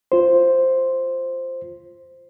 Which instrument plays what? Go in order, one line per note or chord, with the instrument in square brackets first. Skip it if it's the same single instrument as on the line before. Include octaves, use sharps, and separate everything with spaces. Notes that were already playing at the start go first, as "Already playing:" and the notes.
[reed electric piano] F4 C5